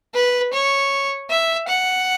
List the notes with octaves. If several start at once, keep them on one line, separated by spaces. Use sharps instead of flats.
B4
C#5
E5
F#5